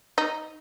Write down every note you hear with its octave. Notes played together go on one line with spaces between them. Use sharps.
D#4